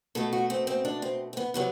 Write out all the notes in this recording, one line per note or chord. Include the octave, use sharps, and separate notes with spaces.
B2 A3 A4
F#4
C4
C4
D4
C4
C4
B3
C3 F#3 B3